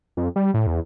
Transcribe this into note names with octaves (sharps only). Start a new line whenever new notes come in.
F2
G3
A2
E2